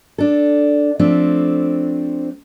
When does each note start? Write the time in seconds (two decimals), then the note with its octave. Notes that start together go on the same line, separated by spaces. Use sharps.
0.18 D4 A4
0.99 F3 A3 C4 D4